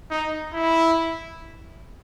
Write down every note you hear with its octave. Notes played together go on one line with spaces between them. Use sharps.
D#4
E4